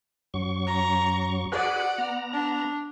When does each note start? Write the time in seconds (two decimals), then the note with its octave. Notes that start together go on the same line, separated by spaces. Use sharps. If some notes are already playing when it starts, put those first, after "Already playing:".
0.34 F#2 F#3 C#6
0.67 A#5
1.52 F#4 G#4 B4 D5 F#5
1.98 B3 A#5
2.33 D4